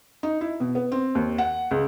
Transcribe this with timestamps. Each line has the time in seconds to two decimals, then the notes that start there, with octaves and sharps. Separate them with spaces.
0.23 D#4
0.41 E4
0.60 B2
0.75 B3
0.92 C4
1.15 D#2
1.38 F#5
1.71 C#2